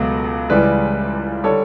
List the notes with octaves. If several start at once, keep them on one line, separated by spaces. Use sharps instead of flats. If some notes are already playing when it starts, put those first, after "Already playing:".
Already playing: C#2 B2 F#3 A3
C#2 C#3 E3 G3 B4 D5
D3 G3 A4 C#5